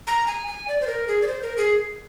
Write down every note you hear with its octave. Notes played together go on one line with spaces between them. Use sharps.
A#5
G#5
G#5
D5
C5
A#4
G#4
D5
C5
A#4
G#4